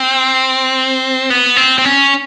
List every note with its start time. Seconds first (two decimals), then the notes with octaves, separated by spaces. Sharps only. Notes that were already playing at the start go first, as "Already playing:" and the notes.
Already playing: C4
1.30 B3
1.56 C4
1.78 C4
1.85 C#4